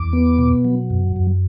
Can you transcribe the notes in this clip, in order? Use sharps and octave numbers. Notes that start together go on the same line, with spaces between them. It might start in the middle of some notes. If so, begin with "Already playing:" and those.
Already playing: E2 D6
B3
B2
F#3
F#2
F#2